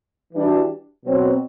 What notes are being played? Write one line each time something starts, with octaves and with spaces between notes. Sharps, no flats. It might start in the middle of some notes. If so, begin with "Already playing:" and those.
E3 G3 D4 F#4
B2 F#3 C4